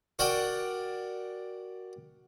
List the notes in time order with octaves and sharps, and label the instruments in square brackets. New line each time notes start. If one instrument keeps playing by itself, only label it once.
[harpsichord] F#4 A#4 D5 F#5 G5